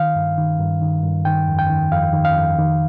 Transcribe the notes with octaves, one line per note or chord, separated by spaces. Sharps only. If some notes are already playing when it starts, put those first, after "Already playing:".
Already playing: D#3 F5
G2
D#3
G2
D#3
G2
D#3 G5
F2
G5
D#3
F2 F5
D#3
F5
F2
D#3